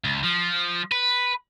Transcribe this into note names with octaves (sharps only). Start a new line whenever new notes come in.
C#2
F3
B4